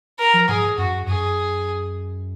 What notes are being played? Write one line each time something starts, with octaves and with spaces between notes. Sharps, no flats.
A#4
F3
G#2 G#4
F#2 F#4
F#2 G#4